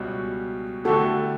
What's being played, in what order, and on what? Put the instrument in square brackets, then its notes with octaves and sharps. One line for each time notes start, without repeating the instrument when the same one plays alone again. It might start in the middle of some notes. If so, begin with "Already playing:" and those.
Already playing: [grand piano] C#2 B2 G3 C#4 F#4
[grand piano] D3 A3 E4 G4 [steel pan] F#4 A4